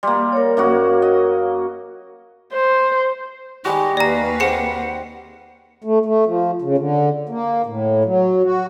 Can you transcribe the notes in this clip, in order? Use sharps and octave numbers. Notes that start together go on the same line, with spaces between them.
G3 A#3 C6
A#4 C#5
F#2 A#3 F#4
D#5
C5
D#3 G3 G#3 F#4 G4
D#2 B4 D5 F5 A#5
C4 G#4 F#5 D6 C#7
A3
A3
F3
C#3
D3
A#3
A2
F#3
F#4